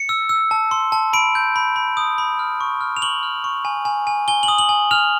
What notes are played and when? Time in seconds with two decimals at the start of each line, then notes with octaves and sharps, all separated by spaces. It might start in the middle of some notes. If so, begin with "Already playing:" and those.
Already playing: C#7
0.09 E6
0.29 E6
0.51 A5
0.71 C6
0.92 A5
1.13 B5 D7
1.35 G6
1.56 B5
1.76 B5
1.97 D#6
2.18 B5
2.39 F6
2.61 C#6
2.81 F6
2.97 F7
3.02 C#6 F#7
3.23 F6
3.44 C#6
3.65 G#5
3.85 G#5
4.07 G#5
4.28 G#5 G7
4.43 F#7
4.48 D#6
4.58 F#7
4.69 G#5
4.91 F6 F7